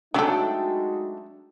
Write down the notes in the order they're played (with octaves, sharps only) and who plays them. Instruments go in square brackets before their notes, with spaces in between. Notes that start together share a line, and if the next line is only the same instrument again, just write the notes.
[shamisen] F#3 A4 [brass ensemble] G#3 D#4 F#4 [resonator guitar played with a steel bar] A3 D4 G5